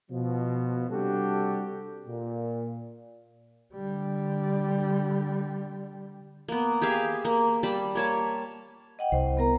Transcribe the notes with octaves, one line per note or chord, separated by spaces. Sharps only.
B2 F3
C3 G3 D4 F#4 G4 A4
A#2
D3 G3
A#3 B3
G4 G#4 E5 F5
A#3
G3 A5 B5
A#3 C#5 A5
D#5 F#5 G5
C2 C5
B3 A#4 A#5